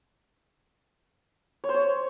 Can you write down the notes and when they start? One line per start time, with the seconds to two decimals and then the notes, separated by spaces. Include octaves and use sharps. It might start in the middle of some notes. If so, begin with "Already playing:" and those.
1.64 C#5
1.69 C5
1.74 C#5